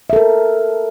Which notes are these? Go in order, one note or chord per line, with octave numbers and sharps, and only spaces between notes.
A4 A#4 E5